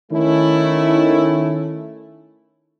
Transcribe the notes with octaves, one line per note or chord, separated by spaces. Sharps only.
D#3 A3 C#4 E4